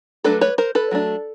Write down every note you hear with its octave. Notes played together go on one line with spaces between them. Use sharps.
F#3 A3 D4 A4 B4
B4 C#5
A#4 C5
A4 B4
F#3 A3 D4